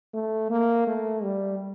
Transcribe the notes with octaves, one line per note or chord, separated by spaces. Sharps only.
A3
A#3
A3
G3